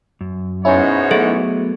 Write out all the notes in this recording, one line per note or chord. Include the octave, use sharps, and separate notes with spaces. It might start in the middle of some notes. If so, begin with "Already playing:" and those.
F#2
G#2 B2 C#4 E4 C#5
F#3 A3 B3 G#4 A4 E5